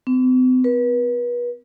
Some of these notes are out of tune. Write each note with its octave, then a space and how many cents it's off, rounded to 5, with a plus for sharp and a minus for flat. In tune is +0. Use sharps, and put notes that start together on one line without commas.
C4 -45
B4 -35